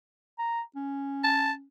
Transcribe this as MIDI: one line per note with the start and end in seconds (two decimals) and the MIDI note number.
0.38 0.61 82
0.75 1.66 61
1.24 1.52 81